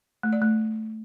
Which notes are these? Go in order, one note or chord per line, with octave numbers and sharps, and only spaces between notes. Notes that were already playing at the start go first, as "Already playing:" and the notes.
A3
D5
A3